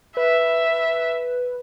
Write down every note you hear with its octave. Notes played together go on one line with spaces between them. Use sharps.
B4 E5